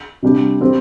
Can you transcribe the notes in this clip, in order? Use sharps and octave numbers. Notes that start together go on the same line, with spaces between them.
C3 G3 D4 G4
G3 C4 G4